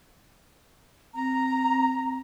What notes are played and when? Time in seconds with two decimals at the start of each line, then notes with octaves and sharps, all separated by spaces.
1.15 C4 A#5